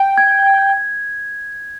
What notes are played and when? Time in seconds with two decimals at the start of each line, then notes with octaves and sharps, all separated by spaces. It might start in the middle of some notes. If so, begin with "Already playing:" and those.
Already playing: G5
0.18 G#6